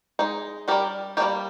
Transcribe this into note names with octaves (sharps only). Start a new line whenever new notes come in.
G#3 D#4
G3 D4 G4 A#4
G3 A#3 D#4 G4 A#4